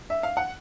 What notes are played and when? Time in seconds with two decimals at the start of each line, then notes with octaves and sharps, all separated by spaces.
0.10 E5
0.23 F5
0.37 F#5